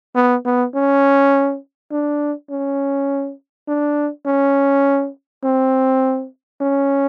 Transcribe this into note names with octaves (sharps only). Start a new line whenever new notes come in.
B3
B3
C#4
D4
C#4
D4
C#4
C4
C#4